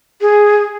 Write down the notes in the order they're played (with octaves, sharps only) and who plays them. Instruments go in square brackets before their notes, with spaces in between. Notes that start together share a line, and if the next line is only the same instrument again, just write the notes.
[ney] G#4